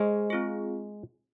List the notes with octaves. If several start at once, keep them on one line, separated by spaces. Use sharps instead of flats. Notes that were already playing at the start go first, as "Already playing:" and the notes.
Already playing: G#3 G#4 C5 D#5
C4 F4 G#4